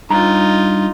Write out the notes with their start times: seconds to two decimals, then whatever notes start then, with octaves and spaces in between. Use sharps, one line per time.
0.10 G2 D#4 F4 A#5